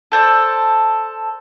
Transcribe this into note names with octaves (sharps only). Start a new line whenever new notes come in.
A4 C5 D5